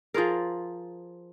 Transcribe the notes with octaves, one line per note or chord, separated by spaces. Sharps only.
F3 F4 G#4 A#4